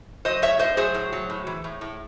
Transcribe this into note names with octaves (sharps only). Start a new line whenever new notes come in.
F#3 C5 D#5
A2 C#5 E5
A2 C5 D#5
F#3 G#4 C5
A2
F#3
A2
E3
A2
A2